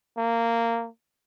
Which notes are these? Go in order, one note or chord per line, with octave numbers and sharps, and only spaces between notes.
A#3